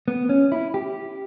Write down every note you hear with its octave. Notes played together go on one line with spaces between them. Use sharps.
B3
C#4
E4
G4